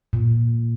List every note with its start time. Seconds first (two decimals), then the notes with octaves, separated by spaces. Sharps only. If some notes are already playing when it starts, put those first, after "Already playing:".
0.13 A#2